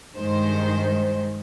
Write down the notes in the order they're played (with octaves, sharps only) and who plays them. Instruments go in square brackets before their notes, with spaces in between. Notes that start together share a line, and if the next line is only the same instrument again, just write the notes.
[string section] G2 D#3 G#3 C5